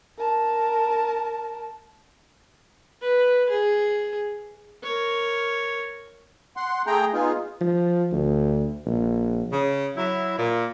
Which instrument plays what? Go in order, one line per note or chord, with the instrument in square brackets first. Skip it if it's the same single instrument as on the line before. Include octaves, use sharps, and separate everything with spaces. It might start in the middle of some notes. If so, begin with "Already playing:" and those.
[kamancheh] A#4 A5
[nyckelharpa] B4
G#4
A#4 C#5
[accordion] F#5 C6
A3 G#4 G5 A#5
B3 D#4 F4 G#4
[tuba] F3
D2
A#1
[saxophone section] C#3
F#3 E4
A#2